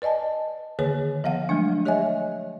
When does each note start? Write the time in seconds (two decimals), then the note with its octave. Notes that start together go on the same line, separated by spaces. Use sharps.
0.02 B4 D5 D#5 G#5 A5
0.79 D3 D#3 A#3 G#4 B4 C#5
1.24 F3 B3 F5 F#5
1.49 F3 F#3 G#3 A3 D4
1.85 G4 C#5 D#5 E5 G#5